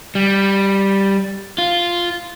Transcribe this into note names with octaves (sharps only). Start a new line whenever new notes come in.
G3
F4